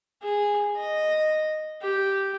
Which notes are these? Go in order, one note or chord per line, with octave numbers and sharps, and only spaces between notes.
G#4
D#5
G4